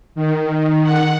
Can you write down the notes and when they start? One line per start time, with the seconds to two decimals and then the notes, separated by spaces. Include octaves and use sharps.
0.15 D#3
0.83 F#5